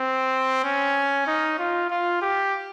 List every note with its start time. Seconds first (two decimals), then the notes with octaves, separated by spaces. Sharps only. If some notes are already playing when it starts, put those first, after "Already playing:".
Already playing: C4
0.64 C#4
1.27 D#4
1.59 F4
1.90 F4
2.22 G4